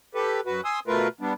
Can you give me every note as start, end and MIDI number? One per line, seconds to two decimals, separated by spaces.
0.15 0.41 67
0.15 0.41 69
0.15 0.41 71
0.46 0.61 42
0.46 0.61 66
0.46 0.61 71
0.65 0.80 80
0.65 0.80 84
0.65 0.80 87
0.65 0.80 88
0.87 1.08 47
0.87 1.08 57
0.87 1.08 65
0.87 1.08 70
0.87 1.08 71
1.21 1.33 55
1.21 1.33 59
1.21 1.33 62